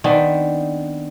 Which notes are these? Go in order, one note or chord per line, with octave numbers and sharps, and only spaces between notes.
D#3 B3 C4 D4